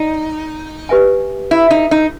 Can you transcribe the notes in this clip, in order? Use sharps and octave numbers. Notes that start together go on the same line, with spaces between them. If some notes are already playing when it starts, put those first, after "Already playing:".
Already playing: D#4 D5
G4 B4 E5 G#5
E4
D#4
D#4